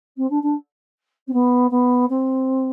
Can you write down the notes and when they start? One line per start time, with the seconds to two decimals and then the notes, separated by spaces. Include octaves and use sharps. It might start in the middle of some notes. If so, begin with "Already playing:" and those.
0.17 C4
0.30 D4
0.42 D4
1.27 C4
1.33 B3
1.70 B3
2.09 C4